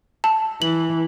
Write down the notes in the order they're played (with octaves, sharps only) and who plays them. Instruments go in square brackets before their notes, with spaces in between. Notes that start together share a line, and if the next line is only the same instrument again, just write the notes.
[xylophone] A5
[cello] E3 [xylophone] F#7